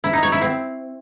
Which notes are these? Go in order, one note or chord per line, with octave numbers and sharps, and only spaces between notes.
E4
D#4
C#5
E4
C4